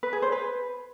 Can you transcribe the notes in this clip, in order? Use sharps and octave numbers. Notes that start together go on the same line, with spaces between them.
B4
G#4
C5
B4